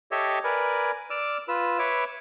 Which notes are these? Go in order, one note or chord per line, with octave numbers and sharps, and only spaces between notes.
G4 A4 C#5 D#5 E5
A#4 B4 D5 G#5
D5 D6 E6 F6
F4 B4 E6
B4 C#5 E5 D6